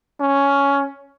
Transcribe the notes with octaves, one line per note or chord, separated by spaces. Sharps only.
C#4